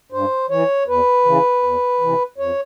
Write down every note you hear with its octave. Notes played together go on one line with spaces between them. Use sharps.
G2 C5
E3 C#5
E2 B4
C#3 E3
E2
C3 E3
F2 C#5